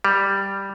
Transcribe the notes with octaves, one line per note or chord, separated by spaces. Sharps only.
G3